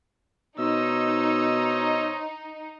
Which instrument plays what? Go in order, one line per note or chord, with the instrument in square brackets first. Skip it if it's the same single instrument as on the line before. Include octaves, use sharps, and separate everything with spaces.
[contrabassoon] B2 [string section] D#4 [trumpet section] C5 C#5 D#5 [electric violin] E6